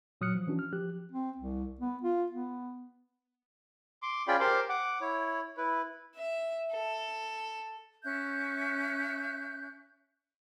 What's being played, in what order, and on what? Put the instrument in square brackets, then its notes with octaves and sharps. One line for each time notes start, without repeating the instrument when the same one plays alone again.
[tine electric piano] A#2 F#3 D#6 F6 F#6 C#7
F3
E3 C#4 D4 F#4
F6
F3 G4 F#6
[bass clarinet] C4
C2
B3
F4
B3
[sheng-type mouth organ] C6 D6
C#4 F4 G#4 D5 G5 B5
G4 A#4 C5 C6 D6
F#5 D6
E4 C#5
E4 B4
[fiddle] E5
A4
[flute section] C#4 E5 F#6 G6